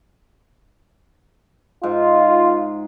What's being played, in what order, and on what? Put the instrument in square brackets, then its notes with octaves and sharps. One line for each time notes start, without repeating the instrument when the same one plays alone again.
[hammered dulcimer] G#2 [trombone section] F4